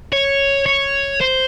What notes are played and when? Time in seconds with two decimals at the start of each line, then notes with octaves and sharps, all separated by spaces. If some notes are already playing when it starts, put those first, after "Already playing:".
0.13 C#5
0.66 C#5
1.21 C5